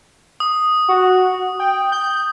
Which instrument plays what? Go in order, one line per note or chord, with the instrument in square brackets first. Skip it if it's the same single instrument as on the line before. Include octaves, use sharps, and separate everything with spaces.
[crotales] D#6
[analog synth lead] F#4
G5
G6